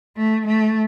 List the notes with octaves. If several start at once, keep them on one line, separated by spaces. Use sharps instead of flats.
A3
A3